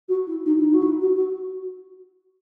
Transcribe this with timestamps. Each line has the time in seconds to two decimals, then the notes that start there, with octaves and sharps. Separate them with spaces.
0.08 F#4
0.27 E4
0.45 D#4
0.58 E4
0.64 D#4
0.73 F#4
0.82 E4
1.01 F#4
1.16 F#4